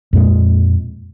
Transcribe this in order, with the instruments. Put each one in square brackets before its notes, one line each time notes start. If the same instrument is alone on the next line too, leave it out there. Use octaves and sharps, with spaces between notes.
[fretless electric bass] F2 A#2 G#3